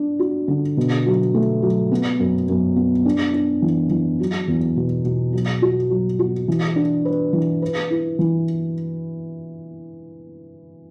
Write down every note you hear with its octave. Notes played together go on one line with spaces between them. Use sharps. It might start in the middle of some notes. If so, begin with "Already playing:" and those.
Already playing: D4
F#4
D3
B2
F#3
A3
F#3
B3
F#2
F#2
B3
D4
D4
E3
E3
F#3
E2
B2
B2
F#3
F#4
F#3
F#4
E3
D4
B4
E3
B4
E4
E3